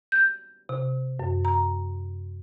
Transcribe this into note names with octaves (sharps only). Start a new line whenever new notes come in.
G6
C3
F#2
A#5